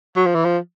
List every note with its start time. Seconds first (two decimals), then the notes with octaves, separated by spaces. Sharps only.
0.16 F#3
0.26 F3
0.35 E3
0.45 F3